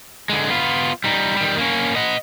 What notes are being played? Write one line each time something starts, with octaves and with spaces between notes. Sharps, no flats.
D3 G#3
B3 F4
G3 D#4
D#3 G3
A#3 C#4
D#5 F#5